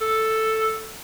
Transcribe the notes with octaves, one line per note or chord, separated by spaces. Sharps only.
A4